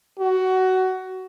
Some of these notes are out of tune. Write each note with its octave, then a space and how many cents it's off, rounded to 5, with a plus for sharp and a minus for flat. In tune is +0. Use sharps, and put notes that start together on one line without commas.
F#4 +15